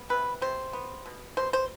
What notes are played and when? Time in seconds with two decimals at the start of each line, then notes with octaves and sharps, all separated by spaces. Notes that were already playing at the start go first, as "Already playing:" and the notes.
Already playing: B3
0.09 C3 B4
0.41 C3 C5
0.73 B3
1.06 B2
1.37 B2 C5
1.53 C5